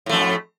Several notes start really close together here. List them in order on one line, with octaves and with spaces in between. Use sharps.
A2 A3 F2